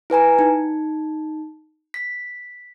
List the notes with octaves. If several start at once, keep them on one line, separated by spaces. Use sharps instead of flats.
E4 B4 G#5 A#5
D#4
B6